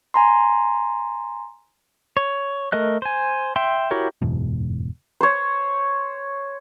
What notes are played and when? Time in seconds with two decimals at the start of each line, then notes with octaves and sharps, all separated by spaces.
0.14 G#5 A#5 C6
2.17 C#5
2.72 A3 A#4 D#5 F#6
3.02 C5 G#5
3.56 E5 G5 C6
3.91 E4 F#4 G4 A#4 C#5
4.22 F#1 E2 G#2 B2
5.21 C5 C#5